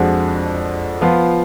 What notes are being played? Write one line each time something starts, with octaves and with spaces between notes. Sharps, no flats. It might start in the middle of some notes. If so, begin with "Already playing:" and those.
Already playing: F2 F3 G#3 D4 F#4
F3 B3 F4